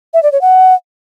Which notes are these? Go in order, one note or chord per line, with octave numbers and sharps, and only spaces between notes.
E5
D5
C#5
F#5